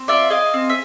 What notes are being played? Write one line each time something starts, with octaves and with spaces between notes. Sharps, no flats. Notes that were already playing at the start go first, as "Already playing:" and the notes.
Already playing: C4
F4 D5 E5
G#4 D#5 F5
C4
E5